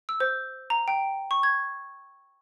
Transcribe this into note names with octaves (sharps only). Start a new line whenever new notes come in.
E6
C5
A#5
G5
C#6
G#6